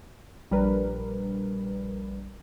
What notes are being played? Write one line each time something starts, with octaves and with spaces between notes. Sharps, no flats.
A#1 G3 D4 A#4 B4